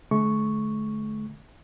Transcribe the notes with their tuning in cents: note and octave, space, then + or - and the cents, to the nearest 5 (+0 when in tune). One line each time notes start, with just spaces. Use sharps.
D3 +0 A3 -45 C#6 +0